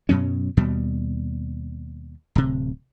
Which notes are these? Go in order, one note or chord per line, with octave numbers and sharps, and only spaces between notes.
F#2 B2 F#3 C#4
D#2 B2 G3
D1 C3